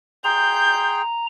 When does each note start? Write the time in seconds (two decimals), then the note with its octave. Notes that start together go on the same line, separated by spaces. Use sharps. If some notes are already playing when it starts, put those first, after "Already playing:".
0.24 G#4 G5 A#5 C6 G6